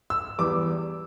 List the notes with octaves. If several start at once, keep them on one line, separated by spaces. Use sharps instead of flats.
E6
E2 E3 G3 D6